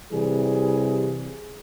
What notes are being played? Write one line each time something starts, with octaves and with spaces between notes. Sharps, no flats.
C3 E3 G3 G#4